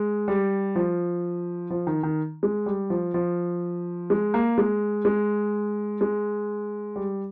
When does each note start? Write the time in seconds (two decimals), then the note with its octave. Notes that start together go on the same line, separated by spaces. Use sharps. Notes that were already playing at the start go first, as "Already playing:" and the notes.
Already playing: G#3
0.28 G3
0.75 F3
1.70 F3
1.87 D#3
2.03 D#3
2.43 G#3
2.66 G3
2.90 F3
3.14 F3
4.10 G#3
4.34 A#3
4.58 G#3
5.05 G#3
6.01 G#3
6.96 G3